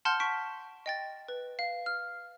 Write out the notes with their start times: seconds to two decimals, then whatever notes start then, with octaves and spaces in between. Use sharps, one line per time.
0.05 F#5 A5 C6 F6 G6
0.20 C#6 B6 D7
0.86 D#5 G5 A6
1.28 B4
1.59 F5
1.86 F6